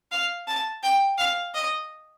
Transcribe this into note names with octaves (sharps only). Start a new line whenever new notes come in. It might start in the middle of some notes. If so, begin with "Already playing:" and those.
F5
A5
G5
F5
D#5